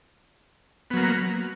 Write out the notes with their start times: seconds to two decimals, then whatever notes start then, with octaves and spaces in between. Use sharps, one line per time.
0.90 B3
0.94 F#3
0.97 A#3